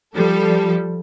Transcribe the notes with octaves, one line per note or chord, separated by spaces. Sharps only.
F3 G3 A4